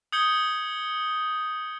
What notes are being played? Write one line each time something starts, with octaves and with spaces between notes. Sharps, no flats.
D#6 G6 G#6 C#7 G7